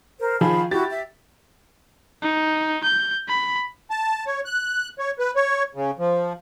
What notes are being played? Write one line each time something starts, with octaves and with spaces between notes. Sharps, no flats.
A#4 C5
D#3 F3 G#4 F5 A5 B5
E4 F#4 G4 G6 A6
E5
D#4
G6
B5
A5
C#5
F#6
C#5
B4
C#5
C#3
F3